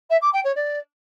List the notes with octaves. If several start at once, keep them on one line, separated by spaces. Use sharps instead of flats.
E5
D6
G5
C#5
D5